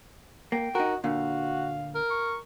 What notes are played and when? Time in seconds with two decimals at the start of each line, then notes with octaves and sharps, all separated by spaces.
0.52 A#3 G5
0.75 D#4 F#4 A#4
1.04 A#2 D3 F#4 F5
1.95 A#4
2.10 C#6